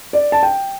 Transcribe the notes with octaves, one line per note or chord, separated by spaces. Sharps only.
D5
A5
G5